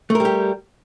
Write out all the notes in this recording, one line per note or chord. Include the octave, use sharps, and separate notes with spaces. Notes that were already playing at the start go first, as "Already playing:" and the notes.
G3 A3 G4 A#4